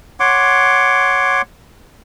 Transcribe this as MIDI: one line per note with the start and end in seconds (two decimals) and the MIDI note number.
0.20 1.42 73
0.20 1.42 78
0.20 1.42 84
0.20 1.42 86